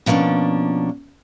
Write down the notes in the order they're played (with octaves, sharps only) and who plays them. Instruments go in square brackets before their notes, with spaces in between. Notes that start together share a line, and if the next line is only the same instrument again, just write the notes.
[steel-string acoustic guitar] B2 F3 A#3 C#4 D4